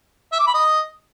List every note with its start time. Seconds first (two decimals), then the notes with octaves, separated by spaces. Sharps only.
0.32 E5
0.40 D6
0.47 B5
0.54 D#5